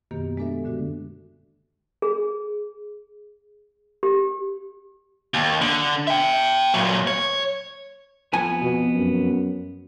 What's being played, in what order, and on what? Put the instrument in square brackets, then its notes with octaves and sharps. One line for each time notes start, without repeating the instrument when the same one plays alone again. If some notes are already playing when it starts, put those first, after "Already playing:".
[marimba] F#2 B2 D#3 A#3 B3 G4
G#3 B3 D4 A4 E5
A#2 D3 G#3 F#4
[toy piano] G#4
G4
[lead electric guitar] D#2
D3
E5 G5
A#2 F#3
C#5
[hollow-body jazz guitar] F2 B3 G#5
[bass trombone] B2
F#2